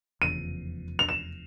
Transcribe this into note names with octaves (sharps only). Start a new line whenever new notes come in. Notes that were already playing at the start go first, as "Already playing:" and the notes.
F1 E2 C#3 F3 D#7
F7
E7